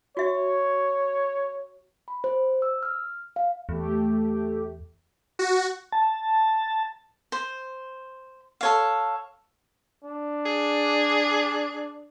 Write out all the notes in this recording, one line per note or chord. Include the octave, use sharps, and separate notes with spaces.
F#4 C#5 E5
B5
C5
E6
F6
F5
E2 A3 G4
F#4
A5
C5
A4 C#5 F5
D4
G#4